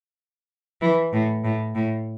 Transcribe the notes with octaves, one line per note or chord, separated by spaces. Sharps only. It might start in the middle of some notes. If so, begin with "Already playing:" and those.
E3
A2
A2
A2